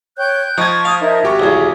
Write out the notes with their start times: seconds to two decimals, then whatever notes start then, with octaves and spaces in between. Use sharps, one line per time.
0.17 C#5 G5 F#6 G6
0.58 F3 D#4 C#6 G#6
0.85 F5 D#6
1.01 D#4 A#4 E5
1.23 G#1 F#4 G4 C#6
1.39 B1 E2 G#4